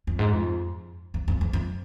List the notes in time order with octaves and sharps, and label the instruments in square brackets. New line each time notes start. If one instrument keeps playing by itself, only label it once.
[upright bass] F2
G#2
F2
F2
F2
E2
F2